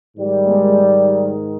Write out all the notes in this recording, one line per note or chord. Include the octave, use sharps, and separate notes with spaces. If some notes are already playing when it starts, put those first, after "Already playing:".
G#2 D#3 G3
G#3 A#3